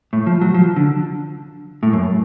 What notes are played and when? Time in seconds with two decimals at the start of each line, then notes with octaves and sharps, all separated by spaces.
0.13 A2
0.27 F3
0.41 F#3
0.54 F3
0.76 D3
1.83 A2
1.93 F#2